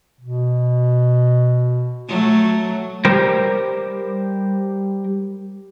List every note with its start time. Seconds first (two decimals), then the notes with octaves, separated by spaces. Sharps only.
0.21 B2
2.08 F#3 A3
3.05 G3 G4 A#4 C5